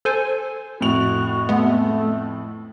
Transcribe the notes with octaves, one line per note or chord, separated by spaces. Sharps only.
A4 C5 G#5
F2 A2 F#4 F7
G#3 A3 B3